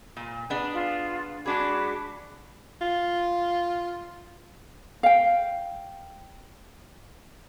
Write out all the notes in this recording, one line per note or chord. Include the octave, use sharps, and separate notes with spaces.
A#2
B3 D4 G#4
F4
G#3 D4 F#4 G#4 B5 D6
F4
F5 G5